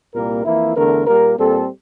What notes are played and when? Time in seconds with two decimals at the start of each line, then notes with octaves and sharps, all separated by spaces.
0.13 C2 A#2 G3 A#3 A#4
0.44 F2 E3 A#3 E4
0.75 E2 D3 A3 A#4
1.06 A#2 G3 A#3 A#4
1.37 A#2 G3 C4 A4